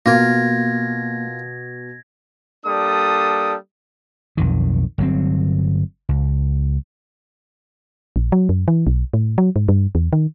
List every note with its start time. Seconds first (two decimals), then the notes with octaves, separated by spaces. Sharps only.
0.06 B2 A#3 F4 A#4 G#6 A#6
2.65 G3 A#3 D4 A4 D#6
4.37 B1 F2 D#3
4.98 G1 F#3 C4
6.09 C#2
8.16 A#1
8.32 F#3
8.49 F#2
8.68 E3
8.87 B1
9.14 A2
9.38 F#3
9.56 G#2
9.68 G2
9.95 E2
10.13 D#3